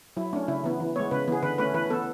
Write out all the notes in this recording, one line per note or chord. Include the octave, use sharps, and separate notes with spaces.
F#3 E4
A3 C#4 D4
C#3 E4
E3 B3
E3
G#3 B3 C#5
C#3 B4
E3 B3 G#4
D3 B4
A3 C#4 B4
E3 B4
B3 A4